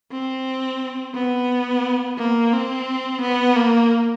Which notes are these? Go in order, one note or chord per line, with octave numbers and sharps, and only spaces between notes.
C4
B3
A#3
C4
B3
A#3